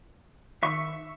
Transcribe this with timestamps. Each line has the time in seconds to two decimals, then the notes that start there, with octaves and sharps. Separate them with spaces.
0.63 D#3 E5 C#6